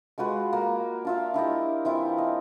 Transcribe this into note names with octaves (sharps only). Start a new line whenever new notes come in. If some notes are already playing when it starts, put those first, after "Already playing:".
G#3 F4 F#4 B4
A#3
D4 F4 E5
D4 E4 G4 D#5
E3 C4 E4 F4
D#5